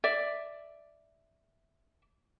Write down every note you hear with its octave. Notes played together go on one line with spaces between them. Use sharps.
D5 E5